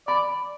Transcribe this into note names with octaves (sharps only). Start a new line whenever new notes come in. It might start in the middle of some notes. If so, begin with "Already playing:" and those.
D5 B5